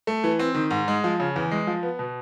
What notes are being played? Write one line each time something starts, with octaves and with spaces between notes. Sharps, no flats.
A3
E3
C4
D#3
G#2
G#3
F3
C#3
E2
G#3
F3
B3
B2